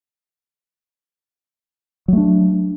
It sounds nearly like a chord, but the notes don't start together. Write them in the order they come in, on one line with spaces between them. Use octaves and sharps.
F#3 A3 D4